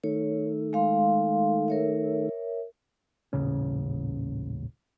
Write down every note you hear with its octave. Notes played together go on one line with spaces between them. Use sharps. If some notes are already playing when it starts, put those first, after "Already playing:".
D#3 A3 C#5
G#3 F5 C6
A#4 C#5 E5
D#1 A1 C#3 C#4